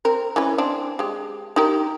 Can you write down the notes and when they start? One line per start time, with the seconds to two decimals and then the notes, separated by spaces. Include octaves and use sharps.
0.05 C4 A#4
0.36 E3 C#4 B4
0.58 C4 D4
0.99 G#3 G4
1.56 D#4 G4 A#4